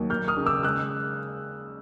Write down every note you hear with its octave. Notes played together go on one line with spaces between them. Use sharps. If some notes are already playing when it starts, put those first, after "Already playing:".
Already playing: D#2 F#3
A#3 F6 G6
D#6 F6
C#3
D6 E6
G#3 E6 F#6